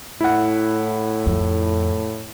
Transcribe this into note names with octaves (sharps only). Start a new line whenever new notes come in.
A2 E4 F#5
F2